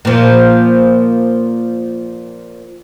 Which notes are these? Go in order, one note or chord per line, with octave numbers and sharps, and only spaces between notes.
A#2 F3